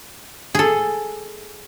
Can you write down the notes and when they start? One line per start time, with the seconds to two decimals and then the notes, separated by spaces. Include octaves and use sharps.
0.55 G#4 A4